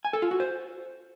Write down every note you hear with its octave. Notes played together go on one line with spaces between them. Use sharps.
G#5
A4
F4
F#4
C5